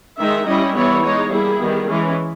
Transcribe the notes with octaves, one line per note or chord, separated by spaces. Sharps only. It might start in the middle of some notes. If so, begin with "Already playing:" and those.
D#3 G#3 D#4 E5
G3 C#4 E4 D#5
E3 G3 B3 E4 C#5
G#3 D#4 C#5
G3 A#3 E4 G#4
D#3 G3 B3
E3 G#3 C#4